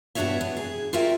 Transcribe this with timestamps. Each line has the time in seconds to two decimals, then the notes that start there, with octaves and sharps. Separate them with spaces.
0.15 G2 B2 D4 F#4 C#5 E5
0.41 B3
0.57 G#4
0.93 F4 F#4 A#4 D5 E5 G5